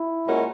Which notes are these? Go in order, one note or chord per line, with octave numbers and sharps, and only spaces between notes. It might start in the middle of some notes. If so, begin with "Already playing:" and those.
Already playing: E4
A#2 G#3 C#4 F#4 A#4